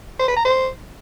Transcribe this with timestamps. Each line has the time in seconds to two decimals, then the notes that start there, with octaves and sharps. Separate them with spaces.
0.19 C5
0.28 B4
0.36 A#5
0.45 C5